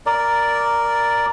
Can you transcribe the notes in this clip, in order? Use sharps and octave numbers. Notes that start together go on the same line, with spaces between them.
A#4 D5